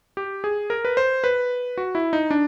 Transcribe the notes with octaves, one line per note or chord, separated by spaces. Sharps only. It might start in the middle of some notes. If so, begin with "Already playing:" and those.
G4
G#4
A#4
B4
C5
B4
F#4
E4
D#4
D4